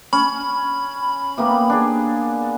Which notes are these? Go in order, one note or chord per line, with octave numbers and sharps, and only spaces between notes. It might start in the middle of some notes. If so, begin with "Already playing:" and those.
C#4 B5
A#3 B3 G4
D4 G#4